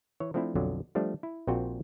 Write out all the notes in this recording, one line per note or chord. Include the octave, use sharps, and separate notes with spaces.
E3 C#5
F3 A3 C4 D4 E4
B1 F2 D3 F#3
F3 G3 A3 D4
E4
A#1 A#2 C4 F4 F#4 G5